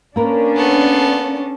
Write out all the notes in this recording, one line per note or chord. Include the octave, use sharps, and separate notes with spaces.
A#3 C#4 D4 A#4 B4
B3 A4